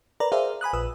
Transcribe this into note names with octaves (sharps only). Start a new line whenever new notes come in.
A#4 B4 D5 A#5
G#4 A#4 C5 D5 E5 F5
G#5 B5 D#6 F#6
A#1 B4 D#6 E6